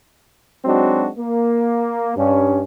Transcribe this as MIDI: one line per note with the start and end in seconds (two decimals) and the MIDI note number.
0.65 1.08 54
0.65 1.08 56
0.65 1.08 60
0.65 1.08 62
0.65 1.08 63
0.65 1.08 66
1.17 2.14 58
2.15 2.61 43
2.15 2.61 61